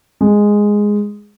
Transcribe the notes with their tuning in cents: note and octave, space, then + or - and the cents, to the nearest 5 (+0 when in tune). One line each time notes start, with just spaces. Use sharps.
G#3 -5